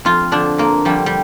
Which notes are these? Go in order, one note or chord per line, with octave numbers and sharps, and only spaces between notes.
F2 F4
D3 F3 D4
F2 A#3
D3 F3 G3
G3